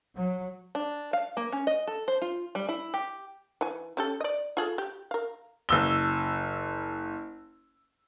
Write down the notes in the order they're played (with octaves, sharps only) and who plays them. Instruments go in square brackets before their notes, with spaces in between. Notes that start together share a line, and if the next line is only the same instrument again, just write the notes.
[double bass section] F#3
[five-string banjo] D4
F5
A#3
C#4
D#5
A4
C5
F4
G3
E4
G4
[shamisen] E3 G#5
C#4 G4 A4
D5 D#5
F4 G#4 A4
G4
A#4 F5
[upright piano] F#1 E6 G7